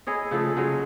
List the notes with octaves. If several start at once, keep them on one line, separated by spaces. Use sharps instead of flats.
E4 G#4 C#5 D#5
C#3 F3 A3 A4
C#3 F#3 G#3 C#4